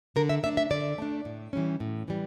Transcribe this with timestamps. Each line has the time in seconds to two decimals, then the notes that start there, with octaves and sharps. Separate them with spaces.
0.16 D3 A#4
0.29 E5
0.43 A3 D4 E5
0.57 E5
0.71 D3 D5
0.98 A3 D4
1.25 A2
1.53 E3 G3 C#4
1.80 A2
2.08 E3 G3